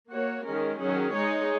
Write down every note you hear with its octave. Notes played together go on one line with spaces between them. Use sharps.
A#3 F#4 C#5
D#3 G#3 C#4 A#4
D#3 F#3 C#4 G#4
G#3 D#4 G#4 C#5